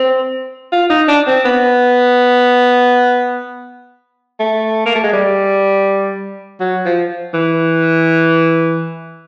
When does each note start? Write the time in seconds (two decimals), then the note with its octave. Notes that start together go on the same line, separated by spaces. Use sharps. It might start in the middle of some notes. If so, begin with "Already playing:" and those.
Already playing: C4
0.72 F4
0.90 D#4
1.08 D4
1.27 C4
1.45 B3
4.40 A3
4.86 A#3
4.95 A3
5.04 G#3
5.13 G3
6.60 F#3
6.85 F3
7.34 E3